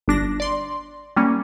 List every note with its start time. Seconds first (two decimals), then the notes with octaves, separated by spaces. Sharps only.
0.08 G1 D4 A#6
0.40 D5 C6
1.16 G3 A#3 C#4